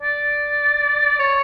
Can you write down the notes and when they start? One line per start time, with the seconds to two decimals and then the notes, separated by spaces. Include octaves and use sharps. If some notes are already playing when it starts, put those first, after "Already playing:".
0.01 D5
1.20 C#5